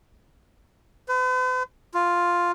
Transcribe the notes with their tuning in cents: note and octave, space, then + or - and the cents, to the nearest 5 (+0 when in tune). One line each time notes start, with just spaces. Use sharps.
B4 +45
F4 +0